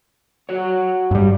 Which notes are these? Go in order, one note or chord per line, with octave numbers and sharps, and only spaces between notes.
F#4 C#5
G2 G3